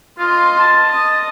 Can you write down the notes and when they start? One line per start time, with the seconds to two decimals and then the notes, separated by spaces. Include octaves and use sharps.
0.19 F4 D#5 C6
0.59 A5
0.91 D#5